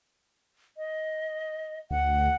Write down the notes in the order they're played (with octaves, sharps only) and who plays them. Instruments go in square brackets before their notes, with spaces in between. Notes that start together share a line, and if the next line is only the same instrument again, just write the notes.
[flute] D#5
[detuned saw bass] D2 [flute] F#5